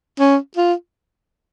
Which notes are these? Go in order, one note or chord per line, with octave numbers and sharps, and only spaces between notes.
C#4
F4